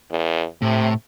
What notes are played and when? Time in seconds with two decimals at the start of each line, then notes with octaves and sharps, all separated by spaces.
0.11 E2
0.62 A2 C3